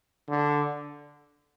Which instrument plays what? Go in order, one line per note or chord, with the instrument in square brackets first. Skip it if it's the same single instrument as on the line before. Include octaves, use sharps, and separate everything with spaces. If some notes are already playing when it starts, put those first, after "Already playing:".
[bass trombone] D3